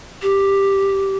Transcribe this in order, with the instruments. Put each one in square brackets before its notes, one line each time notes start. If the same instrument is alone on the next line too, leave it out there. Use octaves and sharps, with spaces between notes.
[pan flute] G4